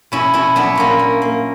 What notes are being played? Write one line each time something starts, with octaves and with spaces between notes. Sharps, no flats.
B2 C#4 E4
B2 C#4 E4
F#3 B3 D4
A#2 A#3 C#4
A#3
A#3